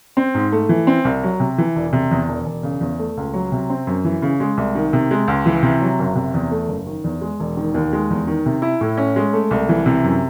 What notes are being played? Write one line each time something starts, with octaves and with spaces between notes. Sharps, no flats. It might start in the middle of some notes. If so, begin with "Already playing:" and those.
C4
G#2
A3
E3
C4
C2
F#3
C3
E3
E1
C3
E2
E1
E1
C#3
E2
A3
C#2
F#3
C3
C4
F#2
E3
C#3
G#3
C2
D#3
C3
G#3
C#2
E3
C3
F#3
F#1
C3
E2
A3
F#1
D#3
E2
G#3
E1
D#3
D#2
G#3
E2
D#3
C3
E4
A2
C#4
G#3
A3
C2
E3
C3
F#2